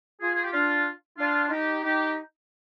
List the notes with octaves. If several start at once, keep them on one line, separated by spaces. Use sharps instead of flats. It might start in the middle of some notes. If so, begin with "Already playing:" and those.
F4 G#4
G#4
G4
D4 F4
D4 F4
F4
D#4 G4
D#4 G4